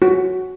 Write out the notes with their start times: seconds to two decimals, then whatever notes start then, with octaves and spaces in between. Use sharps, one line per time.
0.02 F#4